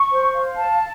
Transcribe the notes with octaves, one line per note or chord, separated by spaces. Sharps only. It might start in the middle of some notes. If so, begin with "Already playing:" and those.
Already playing: C#6
C5
F5
A5